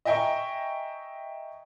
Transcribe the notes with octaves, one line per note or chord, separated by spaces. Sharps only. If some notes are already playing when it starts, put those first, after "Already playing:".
D#5 E5 G5 G#5 A#5 C#6